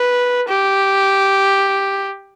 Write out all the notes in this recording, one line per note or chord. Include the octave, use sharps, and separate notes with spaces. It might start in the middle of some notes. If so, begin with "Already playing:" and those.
Already playing: B4
G4